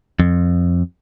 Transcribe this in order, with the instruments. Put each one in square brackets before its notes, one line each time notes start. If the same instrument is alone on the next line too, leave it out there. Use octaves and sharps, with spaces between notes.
[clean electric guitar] F2